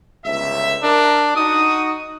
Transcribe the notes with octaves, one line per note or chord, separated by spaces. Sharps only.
G1 C#2 E5
D4 A#4
D#4 F#4 D#6